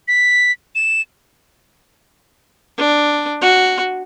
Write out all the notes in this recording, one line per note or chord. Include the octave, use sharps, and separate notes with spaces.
B6
E7
D4
F#4